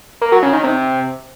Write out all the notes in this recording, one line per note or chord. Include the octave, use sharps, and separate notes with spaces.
A#3
F#3
C#3
D#3
C3